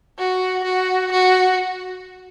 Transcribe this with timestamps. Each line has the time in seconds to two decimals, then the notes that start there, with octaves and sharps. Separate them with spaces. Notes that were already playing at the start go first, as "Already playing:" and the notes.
0.19 F#4
0.64 F#4
1.12 F#4